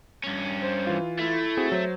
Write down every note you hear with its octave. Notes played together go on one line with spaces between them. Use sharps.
G2 C#4
C5
E3 F4
A3 E4
C4 F#4 G#4
F#3 C5